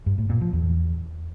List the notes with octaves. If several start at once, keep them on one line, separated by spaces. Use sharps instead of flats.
G2
A2
A#2
F3
E2